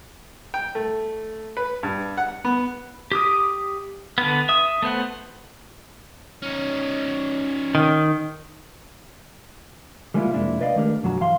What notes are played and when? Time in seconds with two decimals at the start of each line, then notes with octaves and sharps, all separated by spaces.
0.54 G5
0.75 A3
1.57 B4
1.83 G2
2.17 F#5
2.45 B3
3.12 G4 D6 D#6
4.18 D3 B3
4.49 E5 D#6
4.82 A3 B3 C5 F#5
6.42 C#4 D#4
7.75 D#3
10.14 G3 G#3 A#3 C#4 E4 F4
10.33 F2 C3 G#3 A#3 D4 E4
10.61 B4 D5 D#5 F5
10.76 D#3 G#3 A3 D4 G4 A#4
11.03 B1 F#2 F#3 F#4 A#5
11.20 G2 E3 F5 C6